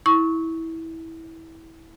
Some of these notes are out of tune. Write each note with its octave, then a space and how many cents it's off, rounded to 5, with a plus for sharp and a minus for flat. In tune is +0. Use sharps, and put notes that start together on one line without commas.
E4 -20 C#6 +0